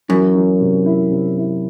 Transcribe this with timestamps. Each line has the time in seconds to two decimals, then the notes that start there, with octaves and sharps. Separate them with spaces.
0.09 F#2 E3
0.35 E3
0.61 C3
0.86 E4
1.11 C3
1.38 E4